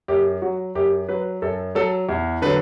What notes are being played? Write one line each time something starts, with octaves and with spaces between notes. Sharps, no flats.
F#2 G4
F#3 F#4
F#2 G4
F#3 B4
F#2 A4
F#3 A4
E2
D3 F#3 B4